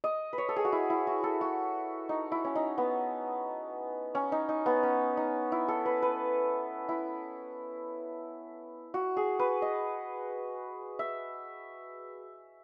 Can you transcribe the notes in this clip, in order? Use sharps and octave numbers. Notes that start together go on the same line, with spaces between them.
D#5
B4
C#5
A4
G#4
F#4
E4
E4
F#4
A4
F#4
D#4
E4
C#4
D#4
B3
C#4
D#4
D#4
B3
C#4
D#4
E4
A4
B4
B4
E4
F#4
G#4
B4
D#5
E5